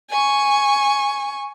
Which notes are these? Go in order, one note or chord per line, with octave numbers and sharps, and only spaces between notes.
G#5 C#6